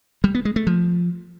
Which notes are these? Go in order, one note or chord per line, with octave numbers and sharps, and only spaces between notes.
G3
B3
G#3
A3
F3